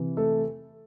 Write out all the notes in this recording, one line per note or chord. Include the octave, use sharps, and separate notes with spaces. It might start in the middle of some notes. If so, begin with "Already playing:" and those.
Already playing: C3 E3
A3 A4